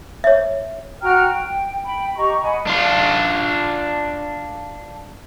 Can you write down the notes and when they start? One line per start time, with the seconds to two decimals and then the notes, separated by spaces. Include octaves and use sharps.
0.24 C#5 E5
1.02 F#4 G5 A#5 F6
1.26 G5
1.84 G5 B5
2.16 G4 D#5 A#5 C#6
2.42 D#5 F#5 G#5 B5
2.67 D4 F4